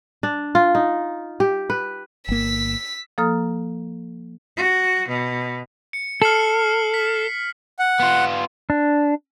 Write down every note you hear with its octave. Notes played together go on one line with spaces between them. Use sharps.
D4
F4
D#4
G4
B4
G1 A#3 E6 B6
F3 A#3 A4 A#5 D#6 F6
F#4
B2
C#7
A4 F6 C7 F#7
B6
F#5
B3 F4
D4